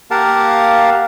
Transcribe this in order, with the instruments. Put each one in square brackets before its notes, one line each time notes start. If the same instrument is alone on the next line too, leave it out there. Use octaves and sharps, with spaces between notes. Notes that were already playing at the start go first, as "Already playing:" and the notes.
[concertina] A#3 G4 A#4 F5 F#5 A5